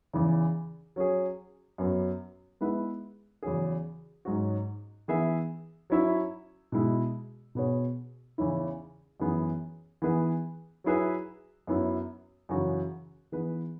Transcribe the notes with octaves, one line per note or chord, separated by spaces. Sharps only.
E2 C#3 E3
F#3 C#4 G#4
F#2 F#3 B3
G#3 B3 E4 B4 E5
E2 C#3 F#3 C#4 G#4
G#2 F#3 C#4 F#4
E3 B3 G#4 E5
F#3 C#4 E4 C#5 E5
B2 G#3 E4
B2 B3 G#4 C#5
E2 C#3 E3 C#4 E4
F#2 E3 B3 G#4
E3 B3 G#4 B4
F#3 E4 G#4 B4 E5
F#2 F#3 B3 E4
F#2 C#3 E3 C#4 F#4
E3 B3 G#4 B4